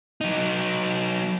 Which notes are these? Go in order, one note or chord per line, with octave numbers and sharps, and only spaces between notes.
F#3 D#4